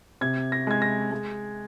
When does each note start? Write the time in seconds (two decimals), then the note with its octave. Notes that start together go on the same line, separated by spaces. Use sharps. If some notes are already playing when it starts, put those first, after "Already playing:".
0.21 C3 G#6
0.52 A#6
0.67 G#3 G#6
0.82 A#6
1.11 G#3